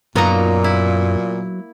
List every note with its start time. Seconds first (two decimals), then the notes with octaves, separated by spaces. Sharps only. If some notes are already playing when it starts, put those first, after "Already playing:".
0.15 F#2 A#2 F#3 A#3 B3 D#4 F4 A#5
0.64 E4